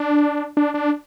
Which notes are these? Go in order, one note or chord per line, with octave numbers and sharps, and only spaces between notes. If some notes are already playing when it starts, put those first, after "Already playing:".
Already playing: D4
D4
D4